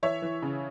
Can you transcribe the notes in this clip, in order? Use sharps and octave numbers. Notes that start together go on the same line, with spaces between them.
E3 C#5 E5
E3
C#3